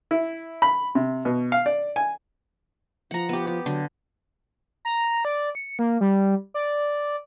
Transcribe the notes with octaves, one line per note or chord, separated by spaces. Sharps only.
E4
B5
C3
B2
F5
D5
G#5
F3 F#5 A#5
B3 G4
G4
D3 F#3
A#5
D5
C#7
A#3
G3
D5